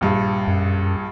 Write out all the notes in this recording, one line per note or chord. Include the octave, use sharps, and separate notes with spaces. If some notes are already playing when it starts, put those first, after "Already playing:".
A#1 G2
F#2